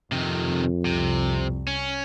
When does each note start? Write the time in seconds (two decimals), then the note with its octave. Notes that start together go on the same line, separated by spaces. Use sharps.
0.12 F2 C3 D#3
0.85 C2 C3
1.67 C#4